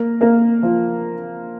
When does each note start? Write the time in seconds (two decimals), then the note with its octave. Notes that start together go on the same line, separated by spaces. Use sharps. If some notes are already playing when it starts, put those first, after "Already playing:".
Already playing: A#3 A#4
0.21 A#3 A#4
0.62 F3 F4